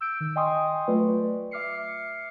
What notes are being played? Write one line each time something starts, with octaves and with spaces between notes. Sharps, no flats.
E6 G6 D7
D#3
D#5 G5 G#5 C6 C#6 D#6
F#3 A3 F4 B4 D5
E5 D6 F6 C7 C#7